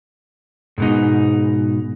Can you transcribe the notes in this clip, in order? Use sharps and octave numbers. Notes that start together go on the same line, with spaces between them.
G#2 B2 D#4